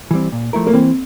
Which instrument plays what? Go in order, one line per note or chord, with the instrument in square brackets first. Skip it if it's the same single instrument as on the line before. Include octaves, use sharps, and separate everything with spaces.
[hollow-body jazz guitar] E3 G3 C4
A#2
F3 A3 E4 A#4
[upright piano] A#3
[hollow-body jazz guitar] E3 [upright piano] C4